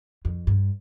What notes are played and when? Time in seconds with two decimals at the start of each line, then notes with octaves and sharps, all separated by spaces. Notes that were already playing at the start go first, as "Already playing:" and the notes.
0.25 F2
0.47 G2